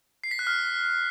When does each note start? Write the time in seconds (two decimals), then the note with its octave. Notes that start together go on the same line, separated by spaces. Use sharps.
0.24 C7
0.31 B6
0.39 F#6
0.47 F6